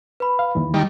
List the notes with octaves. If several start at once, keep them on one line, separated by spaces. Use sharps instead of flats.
B4 B5
F5
D#2 E3
D#3 G3